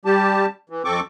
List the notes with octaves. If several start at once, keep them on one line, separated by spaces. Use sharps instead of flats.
G3 G4 A5
E3
F2 C4 A4 C#6 D6